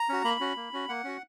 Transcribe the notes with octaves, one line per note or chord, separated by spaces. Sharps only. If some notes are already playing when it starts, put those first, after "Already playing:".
Already playing: A#5
C#4 F#4
A#3 B5
C#4 F#4
A#3
C#4 F#4
A#3 F#5
C#4 F#4